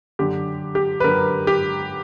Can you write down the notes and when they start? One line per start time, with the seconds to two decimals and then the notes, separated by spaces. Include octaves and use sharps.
0.19 F#2 D3 G4
0.75 G4
1.00 B4
1.04 F#2 D3 A#4
1.47 G4